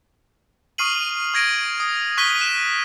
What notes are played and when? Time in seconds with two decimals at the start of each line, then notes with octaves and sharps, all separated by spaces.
0.78 C#6 D#6 F6 C7 D#7 F#7
1.34 C#6 G#6 A#6 D7 D#7
1.80 D#6
2.18 C#6 F#6 B6 D#7 G7
2.41 F#6 E7